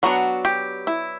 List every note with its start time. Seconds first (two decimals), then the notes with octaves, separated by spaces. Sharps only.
0.03 F#3 B3 D4 F#4
0.45 G4
0.87 E4